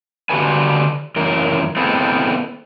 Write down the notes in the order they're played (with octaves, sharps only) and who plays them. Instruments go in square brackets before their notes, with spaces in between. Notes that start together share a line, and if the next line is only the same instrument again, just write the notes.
[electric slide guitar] D3 F#4 G4 A4 B4 G#5
F#2 E3 A#4
B3 C4 E4 G#4 A4